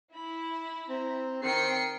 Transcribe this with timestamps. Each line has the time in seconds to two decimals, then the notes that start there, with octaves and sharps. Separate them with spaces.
0.14 E4 B5
0.89 C4 A#5
1.42 D#3 C4 G5 C7 C#7